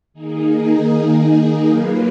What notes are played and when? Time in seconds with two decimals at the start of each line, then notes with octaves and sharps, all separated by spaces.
0.13 D#3 A#3 D#4 G#4
1.67 F#3 A#3 F4 B4